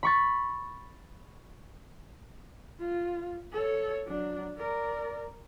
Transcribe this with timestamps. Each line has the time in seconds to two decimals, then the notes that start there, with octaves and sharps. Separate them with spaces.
0.03 B5 C#6 A6
2.80 F4
3.52 A4 C#5
4.07 F#3 D4
4.57 A#4 D5